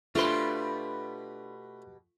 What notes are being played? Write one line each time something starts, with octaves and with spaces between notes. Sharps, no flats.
B2 A3 D4 F4 G4 B4 C5